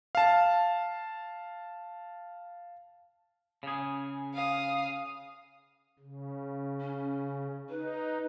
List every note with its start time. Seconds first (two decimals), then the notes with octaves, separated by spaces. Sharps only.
0.15 F5 A5
3.63 C#3 G#4
4.34 F5 D#6
5.99 C#3
6.81 C#4
7.70 D#4 B4